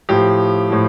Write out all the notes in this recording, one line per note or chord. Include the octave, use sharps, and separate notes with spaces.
A2 F3 G4
A2 F3